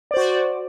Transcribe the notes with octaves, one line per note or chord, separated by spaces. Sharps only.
F#4 C5 D5